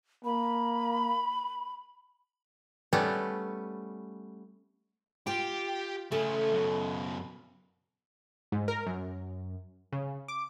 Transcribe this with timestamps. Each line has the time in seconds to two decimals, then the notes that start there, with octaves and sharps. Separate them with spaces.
0.25 A#3 B5
2.93 G3 A3 B3 C#4
5.27 F4 G4 G5
6.12 C#3 A3 C#4 A4
6.53 F#2 B2
8.52 G#2
8.68 A#4
8.86 F#2
9.92 C#3
10.28 D6